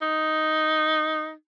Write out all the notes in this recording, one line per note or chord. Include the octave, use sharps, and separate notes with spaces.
D#4